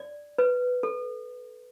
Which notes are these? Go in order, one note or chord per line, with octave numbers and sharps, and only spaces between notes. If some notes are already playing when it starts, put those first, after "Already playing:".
Already playing: D5
B4
A4